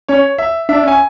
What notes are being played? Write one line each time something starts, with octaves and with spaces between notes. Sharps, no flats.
C#4 C#5
E5
D4 E5
C#4 G#5